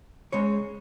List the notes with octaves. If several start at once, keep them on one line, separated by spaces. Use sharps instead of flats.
C#3 G#3 C#5